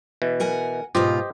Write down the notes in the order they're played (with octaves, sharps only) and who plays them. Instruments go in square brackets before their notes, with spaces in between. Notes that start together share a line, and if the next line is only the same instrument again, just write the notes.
[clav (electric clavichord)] B2 E3
[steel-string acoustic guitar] A#4 F#5 G#5
[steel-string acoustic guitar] G#2 B2 F4 [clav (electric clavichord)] G4 C5 D#5